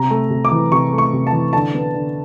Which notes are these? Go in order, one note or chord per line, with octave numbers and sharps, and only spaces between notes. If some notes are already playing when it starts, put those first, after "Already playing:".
Already playing: C3 A#5
A3
C3
D6
E3
C3 C#6
A3
C#6
C3
A5
E3
D3 A5
B3
D3